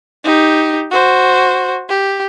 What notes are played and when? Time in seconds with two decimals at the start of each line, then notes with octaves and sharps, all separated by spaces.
0.24 D#4 G4
0.91 F#4 C5
1.89 G4